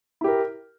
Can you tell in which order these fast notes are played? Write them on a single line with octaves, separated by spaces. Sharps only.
E4 G4 A#4